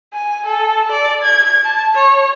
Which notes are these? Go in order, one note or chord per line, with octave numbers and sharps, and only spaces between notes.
G#5
A4
D5
G#6
A5
C#5